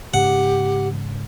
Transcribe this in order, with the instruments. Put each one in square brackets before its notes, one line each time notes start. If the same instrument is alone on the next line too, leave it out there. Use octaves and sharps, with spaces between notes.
[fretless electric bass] G#2 C#3 [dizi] G4 [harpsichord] F#5